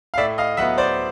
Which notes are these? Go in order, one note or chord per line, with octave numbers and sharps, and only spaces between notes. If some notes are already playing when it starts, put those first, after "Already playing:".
F5
A2 D5 E5
D#5 F5
F#3 B3 E5 F#5
C5 D5